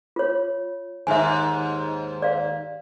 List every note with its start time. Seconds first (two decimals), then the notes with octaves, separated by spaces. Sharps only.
0.16 F4 C#5
1.07 D#2 G#2 E5 G#5
2.22 D5 F5